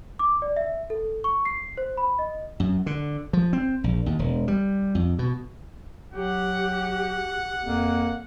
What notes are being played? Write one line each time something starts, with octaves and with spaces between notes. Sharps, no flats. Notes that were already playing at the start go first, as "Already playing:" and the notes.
D6
D5
E5
A4
C#6
C7
C5
B5
D#5
F#2
D3
F3
C4
A#1
D#2
E1
G3
F2
B2
F#3 G4 F#5
F2 A#3